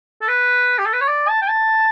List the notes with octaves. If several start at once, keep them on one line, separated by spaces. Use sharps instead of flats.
A4
B4
G4
A4
B4
C#5
D5
A5
G5
A5